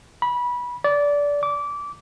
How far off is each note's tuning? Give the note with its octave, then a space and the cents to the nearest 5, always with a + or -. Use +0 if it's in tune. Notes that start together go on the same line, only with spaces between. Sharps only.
B5 -20
D5 -20
D6 -20